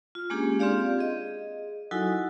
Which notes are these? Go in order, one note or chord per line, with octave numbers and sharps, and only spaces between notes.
F4
G#3 A#3 C#4 D4 G4 G#4
C4 F4 G4 D5 F5
G#4 D#5
F#3 D#4 E4 F#4 A4 G#5